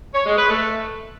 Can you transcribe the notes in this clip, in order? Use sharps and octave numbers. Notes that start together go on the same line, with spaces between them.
C#5
G#3
B4
A3